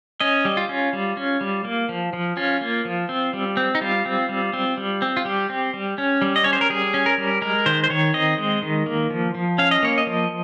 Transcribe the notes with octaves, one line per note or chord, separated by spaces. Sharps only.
C#4 D#5
G3
F4
C#4
G3
C#4
G3
A#3
F3
F3
C#4 F4
A#3
F3
C4
G3
C4
D#4
G3 F4
C4
G3
C4
G3
C4
F4
G3 G4
C4
G3
C#4
G3
D#5
C#4 C#5
C5
A#4
G3 G#4
C#4
A#4
G3
G#3 A#4
D#3 C5
C5
D#3 C#5
C4 D#5
G#3
D#3
A#3
F3
F3
C#4 F5
D#5
A#3 C#5
D#5
F3